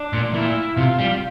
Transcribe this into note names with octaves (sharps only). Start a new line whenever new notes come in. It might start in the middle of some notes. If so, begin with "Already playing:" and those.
Already playing: D4
A#2
A#2 E4
C3 F4
G3